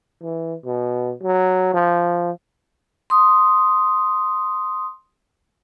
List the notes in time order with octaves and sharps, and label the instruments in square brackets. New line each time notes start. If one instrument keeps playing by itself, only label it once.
[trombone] E3
B2
F#3
F3
[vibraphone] C6 D#6